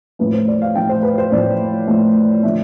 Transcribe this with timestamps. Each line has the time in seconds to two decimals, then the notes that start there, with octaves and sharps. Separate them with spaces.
0.19 A2 F3 A3 B4
0.33 C5
0.48 D5
0.62 F5
0.75 A2 F3 A3 G5
0.89 C5
1.03 B4
1.18 C5
1.32 A2 F3 A3 D5
1.87 A2 F3 A3
2.43 D3 F3 A3 E5